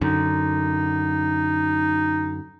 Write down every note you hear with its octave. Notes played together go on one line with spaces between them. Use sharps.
F#2 D3 D#4